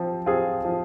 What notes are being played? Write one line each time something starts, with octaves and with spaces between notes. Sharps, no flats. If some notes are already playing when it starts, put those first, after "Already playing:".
Already playing: F3 C4
C4 F4 G#4
F3